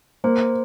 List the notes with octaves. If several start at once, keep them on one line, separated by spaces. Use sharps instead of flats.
A#3 C5